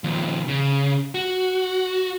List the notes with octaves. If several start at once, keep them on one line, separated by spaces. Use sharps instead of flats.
D#2 F3
C#3
F#4